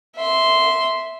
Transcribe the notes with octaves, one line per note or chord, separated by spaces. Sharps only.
E5 C6